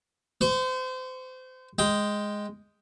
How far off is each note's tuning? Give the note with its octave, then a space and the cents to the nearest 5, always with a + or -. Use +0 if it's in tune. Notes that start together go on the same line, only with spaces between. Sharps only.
C5 -30 C#6 +0
G#3 +0 G5 +0